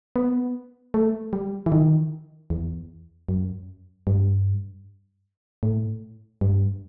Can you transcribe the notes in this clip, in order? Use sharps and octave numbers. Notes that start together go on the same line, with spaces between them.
B3
A3
G3
E3
D#3
E2
F#2
G2
A2
G2